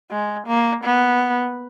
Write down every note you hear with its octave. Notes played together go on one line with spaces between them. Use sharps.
G#3
A#3
B3